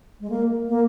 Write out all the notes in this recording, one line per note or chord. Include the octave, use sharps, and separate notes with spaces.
G#3
A#3
A#3